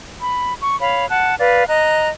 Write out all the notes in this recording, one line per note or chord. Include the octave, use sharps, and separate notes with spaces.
B5
C#6
C#5 F5 B5
F#5 A5 F#6
B4 D5 F5
D#5 A#5 F#6